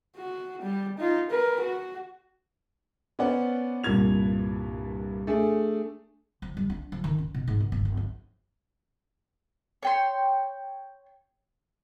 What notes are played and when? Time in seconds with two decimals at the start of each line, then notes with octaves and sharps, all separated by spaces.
0.16 F#4
0.62 G3
0.99 D#4 F4
1.31 A#4 B4
1.60 F#4
3.19 B3 C#4 C5 D5 F#5
3.84 C2 G2 A#2 G#6 F7
5.27 A3 D4 G#4
6.42 F3
6.57 G3
6.70 D4
6.92 F3
7.04 D#3
7.18 C#4
7.34 B2
7.48 G#2
7.60 B2
7.72 G1
7.85 G1
7.97 F2
9.83 C#5 G5 C6